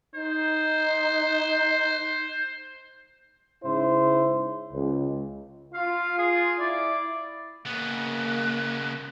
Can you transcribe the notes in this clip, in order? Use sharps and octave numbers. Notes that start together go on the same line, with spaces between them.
D#4 C5
G#2 C#3 E4 C5
C#2
F4 F5
G#4
E4 D5
C#3 A#3 B3 F#6